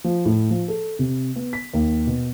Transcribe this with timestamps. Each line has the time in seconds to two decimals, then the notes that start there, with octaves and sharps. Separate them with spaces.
0.04 F3
0.25 A2
0.51 F3
0.68 A4
0.99 C3
1.36 B3
1.53 B6
1.74 D#2
2.07 B2